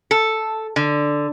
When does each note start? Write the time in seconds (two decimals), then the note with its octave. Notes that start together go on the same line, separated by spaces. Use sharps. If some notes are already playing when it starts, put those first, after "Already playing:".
0.11 A4
0.76 D3